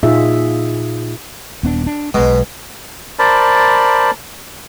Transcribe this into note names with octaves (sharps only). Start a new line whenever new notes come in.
A#2 D#4 F4 G#4 E5
D#1 B3 D4
D4
B1 B2 G#3
A#4 C5 D5 A5 B5